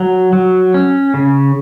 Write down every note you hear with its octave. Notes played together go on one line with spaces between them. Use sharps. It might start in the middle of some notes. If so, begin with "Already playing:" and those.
Already playing: F#3
F#3
C#4
C#3